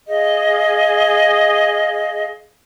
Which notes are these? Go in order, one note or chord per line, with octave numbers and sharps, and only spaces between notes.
G#4 D#5 F5